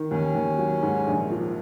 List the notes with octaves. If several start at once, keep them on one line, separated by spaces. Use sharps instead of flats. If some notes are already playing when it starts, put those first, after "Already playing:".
Already playing: D#3
D#2 C#4
D#2
F#3
G#2
A#1
F3